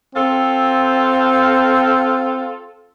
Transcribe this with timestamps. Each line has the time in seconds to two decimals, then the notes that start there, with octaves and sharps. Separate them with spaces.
0.15 C4 F4 A4